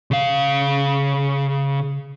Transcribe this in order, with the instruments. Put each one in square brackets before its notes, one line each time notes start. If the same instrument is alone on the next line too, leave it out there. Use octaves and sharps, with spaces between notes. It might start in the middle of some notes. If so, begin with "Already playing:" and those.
[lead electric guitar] C#3 F5